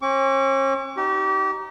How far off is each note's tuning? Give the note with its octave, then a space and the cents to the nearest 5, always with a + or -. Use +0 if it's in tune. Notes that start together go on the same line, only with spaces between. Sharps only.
C#4 -40 C#6 +45
D#4 +0 G4 -30